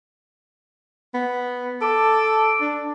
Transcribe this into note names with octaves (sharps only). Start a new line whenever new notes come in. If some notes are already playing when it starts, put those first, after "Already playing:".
B3
A4 D6
D4